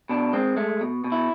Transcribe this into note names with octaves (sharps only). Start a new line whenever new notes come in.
B2 D4
G#3 C4
G#3 A3
B2
B2
E4